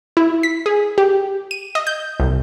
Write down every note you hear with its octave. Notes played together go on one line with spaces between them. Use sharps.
E4
B6
G#4
G4
D#7
D#5
G6
C2